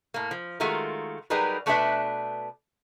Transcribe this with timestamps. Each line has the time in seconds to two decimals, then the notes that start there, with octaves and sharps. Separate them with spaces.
0.14 A2 A#3
0.31 F3
0.60 D#3 G#3 A3 F4 F#4 A#4
1.30 F#3 G3 D#4 G#4 A#4 B4
1.66 B2 A3 B3 D4 B4 E5